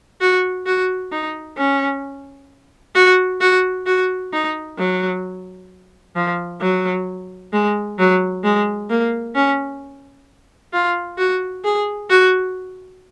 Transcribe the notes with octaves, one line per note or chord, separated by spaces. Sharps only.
F#4
F#4
D#4
C#4
F#4
F#4
F#4
D#4
F#3
F3
F#3
G#3
F#3
G#3
A#3
C#4
F4
F#4
G#4
F#4